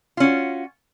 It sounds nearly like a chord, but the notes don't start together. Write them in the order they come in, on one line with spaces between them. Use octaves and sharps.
F4 C#4 F#4